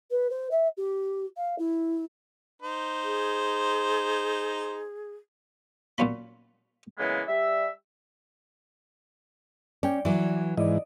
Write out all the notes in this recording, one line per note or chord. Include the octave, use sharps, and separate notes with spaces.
B4
C5
E5
G4
F5
E4
D#4 C5
G#4
A#2 F#3 C#4 F4 B5
C#3 E3 G#3 A#3 B3
G3 E5
C#4 D5 G5
E3 F#3 D5
G#2 E3 D5 D#5